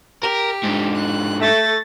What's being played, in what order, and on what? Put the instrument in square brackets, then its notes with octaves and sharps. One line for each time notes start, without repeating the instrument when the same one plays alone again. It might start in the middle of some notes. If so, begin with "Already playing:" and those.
[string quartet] G4 [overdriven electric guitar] A#4
[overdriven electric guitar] G#2 D3
[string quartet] F#6
[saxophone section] A3 [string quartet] A6 A#6